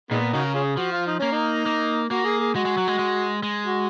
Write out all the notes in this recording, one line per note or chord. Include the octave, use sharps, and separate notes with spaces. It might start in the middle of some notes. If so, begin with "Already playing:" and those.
A#2 D#3 G#3 B3
C#3 D#4 F#4 A#4
C#4 F4 G#4
F3 F#4
F4
D#4
A#3 C#4
D#4
A#3
A#3 F#4
G#4
G#4
G#3 F#4
G#3
F#3
G#3
G#3
G#3
F#4